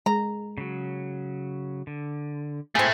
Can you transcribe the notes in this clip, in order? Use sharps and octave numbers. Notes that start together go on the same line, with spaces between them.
G#3 A#5
C#3 F#3
D3
A3 C4 E4 G#4